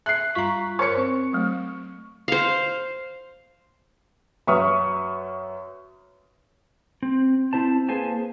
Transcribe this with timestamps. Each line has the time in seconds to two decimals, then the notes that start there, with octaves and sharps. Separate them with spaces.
0.06 E5 F#6 C7
0.35 G2 F4 A#5 C#6 B6
0.79 A#4 C5 C#5 C#6 C#7
0.98 C4
1.33 F#3 A3
2.28 C5 F5
4.47 F#2 B4 E5 C#6 D#6 F6
7.02 C4
7.53 C4 E4 C5 A5
7.89 A#3 G#4 B4 C5 G#5 A5